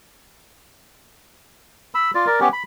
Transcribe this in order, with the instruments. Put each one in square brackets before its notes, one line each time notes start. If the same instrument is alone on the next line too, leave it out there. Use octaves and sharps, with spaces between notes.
[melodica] B5 E6
F4 D5
A#4 D5
B3 C#4 G4
B5